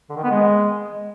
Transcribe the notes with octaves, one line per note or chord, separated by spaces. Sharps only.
D3
D#3
B3
G#3